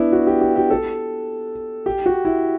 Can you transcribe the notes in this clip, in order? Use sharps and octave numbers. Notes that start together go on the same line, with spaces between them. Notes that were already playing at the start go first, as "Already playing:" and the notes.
Already playing: B3 D4 E4
F#4
G4
G4
G4
A4
G4
F#4
E4